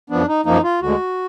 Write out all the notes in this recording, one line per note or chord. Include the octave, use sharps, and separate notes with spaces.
F#2 F3 B3 D4
D#4
F#2 F3 A#3 D#4
F4
D2 D3 G#3 F#4